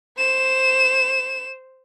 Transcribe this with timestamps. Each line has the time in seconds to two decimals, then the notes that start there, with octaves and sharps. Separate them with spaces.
0.18 C5 E7